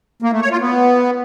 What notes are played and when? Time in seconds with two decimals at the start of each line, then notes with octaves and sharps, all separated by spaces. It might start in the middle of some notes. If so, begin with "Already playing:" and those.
0.22 A#3
0.32 A3
0.41 C#5
0.51 F4
0.61 B3